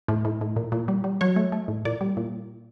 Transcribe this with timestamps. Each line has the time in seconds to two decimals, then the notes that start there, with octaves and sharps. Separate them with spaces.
0.08 A2
0.25 A2
0.41 A2
0.56 A#2
0.72 A#2
0.88 G3
1.04 G3
1.21 F#3 C#5
1.36 A3
1.52 A3
1.68 A2
1.85 A#2 D5
2.01 G3
2.17 A#2